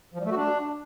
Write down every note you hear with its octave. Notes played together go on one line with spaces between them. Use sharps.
F3
G3
A3
F#4
D4